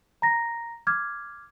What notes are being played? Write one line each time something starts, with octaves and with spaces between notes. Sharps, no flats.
A#5 A#6
D6 F6 G#6